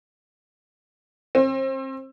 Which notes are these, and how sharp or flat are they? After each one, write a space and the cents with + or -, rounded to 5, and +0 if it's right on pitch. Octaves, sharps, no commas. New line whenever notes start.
C4 +35